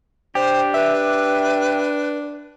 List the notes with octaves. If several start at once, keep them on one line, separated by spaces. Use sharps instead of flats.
D4 G4 C5
B4 E5